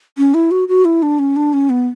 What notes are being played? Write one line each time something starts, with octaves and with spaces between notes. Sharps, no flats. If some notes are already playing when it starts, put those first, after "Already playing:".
C#4
E4
F#4
F#4
E4
D4
C#4
D4
C#4
B3